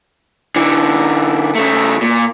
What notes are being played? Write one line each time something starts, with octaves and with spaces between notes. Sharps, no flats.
D3 E3
C#3 A3
A#2